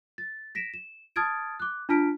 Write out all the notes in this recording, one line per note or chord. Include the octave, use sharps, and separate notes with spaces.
A6
A#6 B6 D7 E7
E7
A5 D#6 F6 G#6 A6 D7
D6 F#6
D4 F4 A5 F6 B6 D7